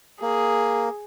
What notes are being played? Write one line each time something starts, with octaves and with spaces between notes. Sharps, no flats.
A#3 G#4